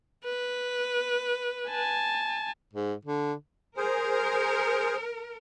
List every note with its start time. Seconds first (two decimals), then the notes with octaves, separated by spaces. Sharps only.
0.24 B4
1.69 G#5 A5
2.73 G#2
3.05 D3
3.77 G#4 A#4 C5